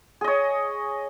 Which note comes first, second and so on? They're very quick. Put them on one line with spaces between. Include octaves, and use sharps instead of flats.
G#4 D#5 C#5